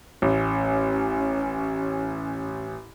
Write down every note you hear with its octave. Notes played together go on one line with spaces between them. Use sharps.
A1 C#4